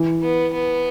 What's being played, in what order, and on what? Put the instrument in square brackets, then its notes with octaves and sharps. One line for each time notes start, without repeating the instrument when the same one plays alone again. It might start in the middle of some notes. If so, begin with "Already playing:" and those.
Already playing: [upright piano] E3
[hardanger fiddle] B3
B3